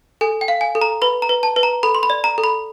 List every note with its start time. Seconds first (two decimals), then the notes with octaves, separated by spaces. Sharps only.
0.21 A4 G#5
0.41 G5
0.48 F5
0.61 G#5
0.75 A4
0.81 A#5
1.02 B4 B5
1.22 A#5
1.29 B4
1.43 A5
1.56 B4
1.63 A#5
1.83 A4 B5
1.95 C6
2.03 B5
2.10 D5
2.24 A#5
2.38 A4
2.44 B5